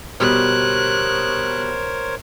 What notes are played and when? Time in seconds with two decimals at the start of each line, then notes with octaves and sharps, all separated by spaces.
0.20 B2 G3 A#4 C5 C#5 F#6